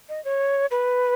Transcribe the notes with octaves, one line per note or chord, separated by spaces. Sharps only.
D#5
C#5
B4